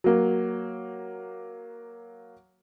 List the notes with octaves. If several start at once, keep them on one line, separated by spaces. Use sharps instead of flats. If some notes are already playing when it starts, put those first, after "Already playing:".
F#3 A#3